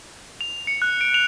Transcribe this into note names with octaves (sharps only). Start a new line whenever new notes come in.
F7
C#7
F#6
D7
F7